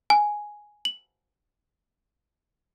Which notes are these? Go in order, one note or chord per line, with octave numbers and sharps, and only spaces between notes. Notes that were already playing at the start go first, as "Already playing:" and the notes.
G#5
F#7